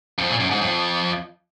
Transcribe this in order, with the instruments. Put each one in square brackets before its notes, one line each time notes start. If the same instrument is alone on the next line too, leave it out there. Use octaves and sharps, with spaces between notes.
[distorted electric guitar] F2
A#2
F#2
G#2
F2